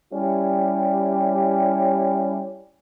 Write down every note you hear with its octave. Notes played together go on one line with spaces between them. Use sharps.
G3 C#4 E4 G4